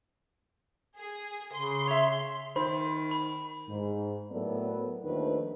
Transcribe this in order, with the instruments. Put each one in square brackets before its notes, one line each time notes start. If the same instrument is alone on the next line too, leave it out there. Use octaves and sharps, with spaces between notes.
[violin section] G#4
[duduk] C#3 [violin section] C6
[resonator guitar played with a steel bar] C#5 E5
[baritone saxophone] D#3 [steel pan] C5 [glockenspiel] B5
[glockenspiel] B5
[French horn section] G#2
A2 F#3 B3 A4 A#4 D5
D#2 D#3 F3 A3 D4 B4